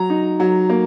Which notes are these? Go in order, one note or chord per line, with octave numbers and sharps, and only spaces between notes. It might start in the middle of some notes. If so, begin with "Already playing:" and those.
Already playing: F#3 A#5
D#4
F#3
A#3